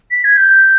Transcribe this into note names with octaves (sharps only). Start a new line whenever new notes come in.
B6
G#6
G6